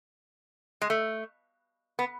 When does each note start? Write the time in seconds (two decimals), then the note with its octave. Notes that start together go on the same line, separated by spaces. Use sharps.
0.82 G#3
0.90 A3
1.99 B3